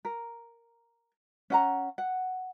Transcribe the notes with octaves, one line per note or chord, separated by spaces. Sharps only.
A#4
C#4 F#5 A#5
F#5